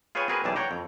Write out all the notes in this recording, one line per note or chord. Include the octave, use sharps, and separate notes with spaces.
F4 G#4 B4 C#5 G5 G#5
C4 F#4 G#4 A#4 B4
B1 E3 G3 G#4 D5 A5
C#5 F#5 G5 A#5
F2